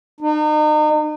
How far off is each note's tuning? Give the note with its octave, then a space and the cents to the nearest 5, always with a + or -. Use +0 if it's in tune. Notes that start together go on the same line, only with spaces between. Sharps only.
D#4 -35